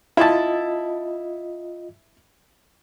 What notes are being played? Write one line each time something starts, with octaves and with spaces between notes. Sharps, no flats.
E4 F4 D#5 A5